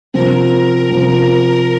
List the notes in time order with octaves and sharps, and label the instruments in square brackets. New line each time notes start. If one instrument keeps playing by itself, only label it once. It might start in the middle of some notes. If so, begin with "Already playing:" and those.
[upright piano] C3 F3 C4 [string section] A#4
[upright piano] C3 F3 C4